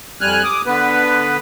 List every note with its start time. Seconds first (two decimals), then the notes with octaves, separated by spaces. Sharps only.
0.21 F2 G3 G#5 F6 F#6
0.44 D6 D#6
0.66 D3 B3 B4